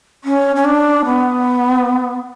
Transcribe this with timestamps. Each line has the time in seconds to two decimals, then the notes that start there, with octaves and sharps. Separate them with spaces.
0.24 C#4
0.56 C#4
0.65 D4
1.05 B3